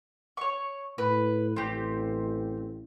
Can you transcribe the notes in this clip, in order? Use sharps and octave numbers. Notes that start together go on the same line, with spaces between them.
C#5 C#6
A2 B4
A1 C4 G4